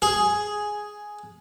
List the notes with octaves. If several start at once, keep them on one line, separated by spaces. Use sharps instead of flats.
G#4